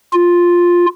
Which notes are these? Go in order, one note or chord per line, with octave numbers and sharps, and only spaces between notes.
F4